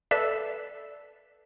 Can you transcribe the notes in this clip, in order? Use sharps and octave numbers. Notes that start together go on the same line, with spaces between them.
A4 B4 D5 E5